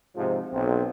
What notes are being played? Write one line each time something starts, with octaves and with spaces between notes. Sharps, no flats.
G#2 C3 F3
B1 C4